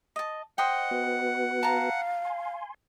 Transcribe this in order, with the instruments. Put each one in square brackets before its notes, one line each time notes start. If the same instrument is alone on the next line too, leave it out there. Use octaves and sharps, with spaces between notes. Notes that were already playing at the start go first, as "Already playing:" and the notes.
[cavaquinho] D#5 A5
[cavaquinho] C5 D#5 G5 [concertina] F#5
[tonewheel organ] B3 F#4 B4
[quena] F5 [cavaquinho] A5 A#5
[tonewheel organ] G#5 C6